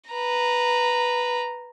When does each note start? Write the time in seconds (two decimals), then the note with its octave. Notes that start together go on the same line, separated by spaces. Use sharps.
0.11 B4 A#5